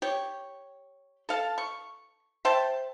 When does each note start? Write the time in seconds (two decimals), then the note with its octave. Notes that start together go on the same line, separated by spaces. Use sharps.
0.02 G4 C#5
1.29 A4 F5 A5
1.58 C#6
2.45 C5 E5 G5 A5